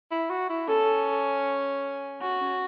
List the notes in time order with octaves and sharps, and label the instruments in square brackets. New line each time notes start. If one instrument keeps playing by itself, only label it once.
[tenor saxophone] E4
F#4
E4
[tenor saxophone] C#4 [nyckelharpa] A4
[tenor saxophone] C#4 [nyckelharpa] F#4
[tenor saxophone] C#4